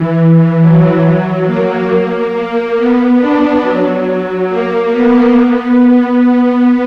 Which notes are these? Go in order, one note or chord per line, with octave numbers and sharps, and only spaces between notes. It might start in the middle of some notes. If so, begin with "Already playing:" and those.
Already playing: E3
F#3
A#3
A#3
B3
D4
F#3
A#3
B3
B3
B3
B3